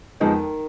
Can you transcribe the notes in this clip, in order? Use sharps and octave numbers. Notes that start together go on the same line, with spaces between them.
F2 D#3 F3 G#3 B3 D#4